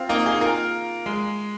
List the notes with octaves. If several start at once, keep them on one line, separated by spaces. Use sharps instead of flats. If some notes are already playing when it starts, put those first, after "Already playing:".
Already playing: C4 F4
A#3 D#4
D#4 G#4
F4 A#4
G#3